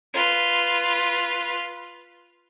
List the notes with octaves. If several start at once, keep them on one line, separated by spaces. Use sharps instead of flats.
F4 B4